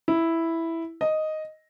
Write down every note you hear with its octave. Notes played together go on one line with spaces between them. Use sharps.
E4
D#5